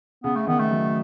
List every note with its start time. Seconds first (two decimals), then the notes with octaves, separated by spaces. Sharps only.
0.24 C#3 B3
0.36 A3
0.47 D#3 B3
0.59 A3
0.71 F#3